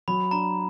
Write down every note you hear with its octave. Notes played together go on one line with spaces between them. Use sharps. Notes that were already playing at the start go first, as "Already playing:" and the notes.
F#3 B5
D4 A#5